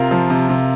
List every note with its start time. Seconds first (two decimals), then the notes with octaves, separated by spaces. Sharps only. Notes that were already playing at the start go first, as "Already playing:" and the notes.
Already playing: C3 F4 A#4
0.11 F3
0.30 C3
0.49 C3